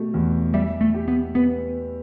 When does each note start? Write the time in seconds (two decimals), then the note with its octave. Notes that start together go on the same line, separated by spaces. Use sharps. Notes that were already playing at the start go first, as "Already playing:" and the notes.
Already playing: B2 A3 G4
0.14 E2
0.54 G3 E5
0.81 A3
0.94 G4
1.08 B3
1.35 B3 B4